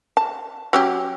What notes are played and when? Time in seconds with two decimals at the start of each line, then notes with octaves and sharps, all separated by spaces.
0.17 A5
0.73 F#3 C#4 G4